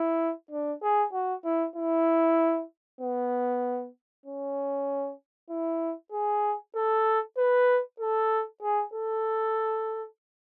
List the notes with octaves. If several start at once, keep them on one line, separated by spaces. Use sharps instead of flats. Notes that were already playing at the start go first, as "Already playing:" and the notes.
Already playing: E4
D4
G#4
F#4
E4
E4
B3
C#4
E4
G#4
A4
B4
A4
G#4
A4